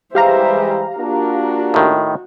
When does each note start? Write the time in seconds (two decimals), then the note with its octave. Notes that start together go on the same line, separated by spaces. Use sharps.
0.15 E3 G3 G#3 G4 C5 E5 F5 A#5
0.97 A#3 D4 F4 F#4
1.74 A2 D#3